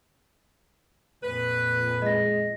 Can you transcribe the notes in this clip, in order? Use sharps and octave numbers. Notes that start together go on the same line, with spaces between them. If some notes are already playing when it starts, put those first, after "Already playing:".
F2 A#2 B4
G#3 D#5 A#6